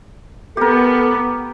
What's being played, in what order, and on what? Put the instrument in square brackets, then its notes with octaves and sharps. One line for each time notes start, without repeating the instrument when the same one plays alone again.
[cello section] B3 [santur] G4 A#4 [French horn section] A4